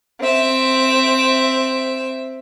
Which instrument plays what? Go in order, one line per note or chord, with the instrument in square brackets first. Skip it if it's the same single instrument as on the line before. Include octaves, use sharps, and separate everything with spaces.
[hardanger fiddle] C4 E5